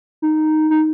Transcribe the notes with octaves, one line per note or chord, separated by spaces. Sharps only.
D#4
D#4